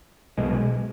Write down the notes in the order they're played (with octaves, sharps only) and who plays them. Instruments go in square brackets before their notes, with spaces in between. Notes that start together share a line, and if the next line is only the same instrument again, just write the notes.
[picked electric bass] B1 B2 G#3